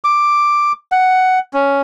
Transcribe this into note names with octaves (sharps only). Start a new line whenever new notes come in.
D6
F#5
C#4